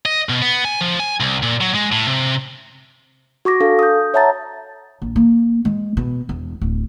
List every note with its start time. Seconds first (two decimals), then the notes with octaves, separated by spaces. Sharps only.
0.06 D#5
0.29 B2
0.42 B3
0.65 G#5
0.81 F3
1.00 G#5
1.20 C2
1.43 A#2
1.61 F#3
1.75 G#3
1.92 A2
2.07 C3
3.45 F#4 C#6 D6 A#6
3.60 D4 A4 F5
3.79 D#6 G6
4.14 C#5 E5 F#5 A5 A#5 A6
5.02 A#1
5.16 A#3
5.65 G#3
5.97 B2
6.29 E1
6.61 D1